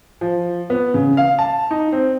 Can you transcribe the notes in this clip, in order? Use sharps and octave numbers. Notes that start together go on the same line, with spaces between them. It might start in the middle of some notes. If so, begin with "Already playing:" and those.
F3
B3
C#3
F5
A5
D#4
C4